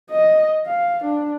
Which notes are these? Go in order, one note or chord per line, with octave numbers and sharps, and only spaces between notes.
D#5
F5
D4